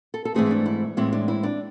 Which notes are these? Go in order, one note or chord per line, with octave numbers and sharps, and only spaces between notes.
A4
A4
G#2 E3 A3 C4 G#4
D4
E4
A2 E3 G#3 C4 E4
D4
E4
D4